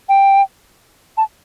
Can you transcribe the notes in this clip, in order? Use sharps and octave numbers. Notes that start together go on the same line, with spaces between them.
G5
A5